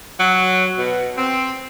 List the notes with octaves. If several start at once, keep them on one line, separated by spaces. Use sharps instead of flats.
F#3
B2
C4